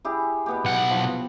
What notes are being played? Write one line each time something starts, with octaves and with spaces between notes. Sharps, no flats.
E4 G4 G#4
B2 B3 G4
B1 F#5
F3